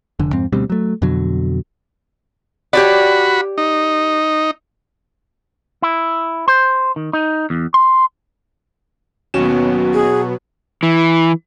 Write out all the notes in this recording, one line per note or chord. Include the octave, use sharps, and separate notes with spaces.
F1 D3
F2 G#2 C4
D2 B2 G3 C4
F#3 A3
F2 B2 D3 F#3
F#4 G4 C#5 D5 B5
D#4
E4
C5
D#3
D#4
E2
C6
D#2 B2 F#3 B3 C#4 F#4 E7
G#4
E3